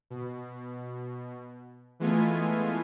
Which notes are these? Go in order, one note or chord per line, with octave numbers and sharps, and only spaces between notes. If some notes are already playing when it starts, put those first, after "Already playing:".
B2
E3 G#3 A3 B3 F4 G#5